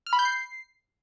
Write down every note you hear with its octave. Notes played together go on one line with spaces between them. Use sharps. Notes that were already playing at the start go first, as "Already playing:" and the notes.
F6
B5
G6
C7